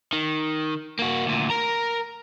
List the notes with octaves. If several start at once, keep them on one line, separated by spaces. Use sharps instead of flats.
D#3
A#3 F#4
D2 A#2
A#4 A#5